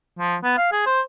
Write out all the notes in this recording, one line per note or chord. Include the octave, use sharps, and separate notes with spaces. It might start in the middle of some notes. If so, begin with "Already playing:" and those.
F3
B3
F5
G#4
C5